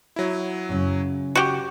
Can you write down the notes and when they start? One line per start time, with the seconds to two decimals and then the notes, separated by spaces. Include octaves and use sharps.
0.16 F#3 E4
0.69 F#2 A#2 C#3
1.35 F#4 G4 C#6